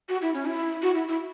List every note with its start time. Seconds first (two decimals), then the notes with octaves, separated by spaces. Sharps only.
0.09 F#4
0.22 E4
0.34 C#4
0.46 E4
0.82 F#4
0.95 E4
1.08 E4